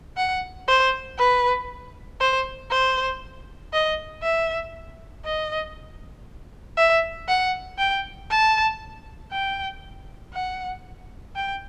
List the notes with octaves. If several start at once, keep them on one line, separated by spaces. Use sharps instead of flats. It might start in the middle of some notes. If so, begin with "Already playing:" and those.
F#5
C5
B4
C5
C5
D#5
E5
D#5
E5
F#5
G5
A5
G5
F#5
G5